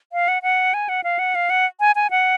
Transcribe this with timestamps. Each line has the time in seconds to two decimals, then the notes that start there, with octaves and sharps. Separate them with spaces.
0.13 F5
0.28 F#5
0.43 F#5
0.74 G#5
0.89 F#5
1.04 F5
1.19 F#5
1.35 F5
1.50 F#5
1.80 G#5
1.96 G#5
2.11 F#5